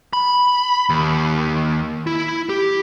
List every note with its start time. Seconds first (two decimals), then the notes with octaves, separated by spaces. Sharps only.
0.13 B5
0.90 D#2
2.07 E4
2.49 G4